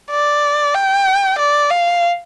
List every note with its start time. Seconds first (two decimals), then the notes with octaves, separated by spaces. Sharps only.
0.11 D5
0.75 G5
1.38 D5
1.70 F5